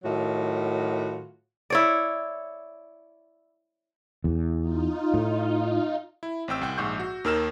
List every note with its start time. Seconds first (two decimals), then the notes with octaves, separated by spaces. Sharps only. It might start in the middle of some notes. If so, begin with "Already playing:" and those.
0.04 A2 D#3 F#3 F4 F#4
1.70 E4 C#5 D5
4.24 E2
4.60 D#4 F4
5.14 A2
6.23 E4
6.48 A1 C4 G5 E6
6.61 C2 G5
6.78 A#1 G#2 C#6 G6
7.00 F#4
7.24 D#2 D#3 A#4 E6 F6 E7